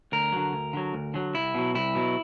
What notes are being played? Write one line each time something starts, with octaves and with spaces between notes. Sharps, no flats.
D2 A#4
D3 F#3
D2
D3 F#3
D2
D3 F#3
C2 E4
B2 F#3
C2 E4
B2 F#3